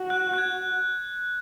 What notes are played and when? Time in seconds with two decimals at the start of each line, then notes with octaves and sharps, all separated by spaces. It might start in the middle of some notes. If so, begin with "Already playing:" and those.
Already playing: F#4
0.10 F#6
0.34 F#6
0.38 G#6